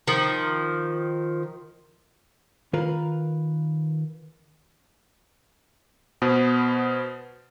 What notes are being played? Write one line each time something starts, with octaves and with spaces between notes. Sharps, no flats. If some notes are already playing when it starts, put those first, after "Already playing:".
D#3 F3
D#3 F4 A#4 B4
B2 B3 C5